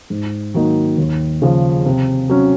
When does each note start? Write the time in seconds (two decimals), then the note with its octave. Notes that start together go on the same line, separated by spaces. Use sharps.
0.10 G#2
0.54 D#3 F#3 A#3 D#4
0.98 D#2
1.42 C#3 F3
1.86 C3
2.30 F#3 C#4